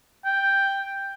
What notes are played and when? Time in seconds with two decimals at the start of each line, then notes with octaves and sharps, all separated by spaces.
0.25 G5